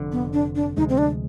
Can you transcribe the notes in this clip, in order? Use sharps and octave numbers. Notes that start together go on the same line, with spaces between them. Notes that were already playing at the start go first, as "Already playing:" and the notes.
Already playing: F1 F2 D3
B3
D4
D4
D2 C3 F3 G#3 D#4
C4
D4